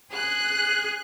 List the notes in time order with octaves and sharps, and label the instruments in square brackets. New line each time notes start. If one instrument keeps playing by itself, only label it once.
[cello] G#4 [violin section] F#6